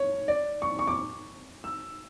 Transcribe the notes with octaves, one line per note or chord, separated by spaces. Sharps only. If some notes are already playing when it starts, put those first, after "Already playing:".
Already playing: C#5
D5
C#6
C#6
D6
E6